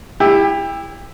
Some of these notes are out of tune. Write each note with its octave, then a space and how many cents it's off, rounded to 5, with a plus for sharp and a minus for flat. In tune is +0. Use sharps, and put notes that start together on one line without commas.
E4 +0 G4 +30